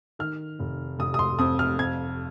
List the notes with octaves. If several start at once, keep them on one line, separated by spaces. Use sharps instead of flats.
D#3 F6
F1
F1 D#6
D#6
C6
F2 D#6
F6
F2 G#6